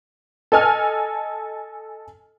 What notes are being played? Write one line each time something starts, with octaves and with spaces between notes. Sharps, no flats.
A4 D#5 G#5 F6